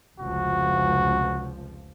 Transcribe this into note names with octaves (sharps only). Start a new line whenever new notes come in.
F1 C#2 F3 F#4